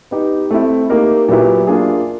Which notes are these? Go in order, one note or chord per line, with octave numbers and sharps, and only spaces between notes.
B3 D#4 G4 B4
A3 C4 E4
A#3 D#4 G4 A#4
A#2 F#3 B3 E4 G4
A#3 D4 F4 G#4